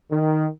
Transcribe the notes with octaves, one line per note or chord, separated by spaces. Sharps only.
D#3